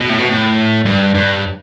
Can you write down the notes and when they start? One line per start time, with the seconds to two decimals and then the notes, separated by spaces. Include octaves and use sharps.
0.01 B2
0.10 A2
0.19 B2
0.29 A2
0.85 G2
1.14 G2